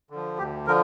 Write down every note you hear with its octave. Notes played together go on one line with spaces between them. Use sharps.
D3 F3
D2 G4
D3 F3 A#4